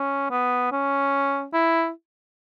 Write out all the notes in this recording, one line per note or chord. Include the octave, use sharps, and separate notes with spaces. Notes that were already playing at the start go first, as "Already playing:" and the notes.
Already playing: C#4
B3
C#4
E4